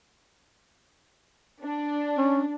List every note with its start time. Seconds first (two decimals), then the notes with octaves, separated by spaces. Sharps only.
1.63 D4
2.18 C#4